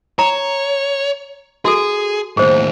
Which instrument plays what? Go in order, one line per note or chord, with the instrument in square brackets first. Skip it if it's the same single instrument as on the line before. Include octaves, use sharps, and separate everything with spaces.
[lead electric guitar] C#5 [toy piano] A#5
[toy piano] F#4 A4 [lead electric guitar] G#4
[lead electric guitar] D#2 A2 [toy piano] G#4 C5